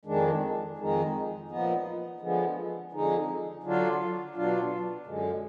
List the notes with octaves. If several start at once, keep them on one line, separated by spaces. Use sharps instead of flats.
F2 D#3 G#3 D4
F2 D#3 G#3 D#4
A#2 F3 B3 D#4
D3 F3 G#3 B3
F2 D3 G#3 D#4
D3 F#3 D4 F4
B2 F#3 D4 F4
F#2 D3 G#3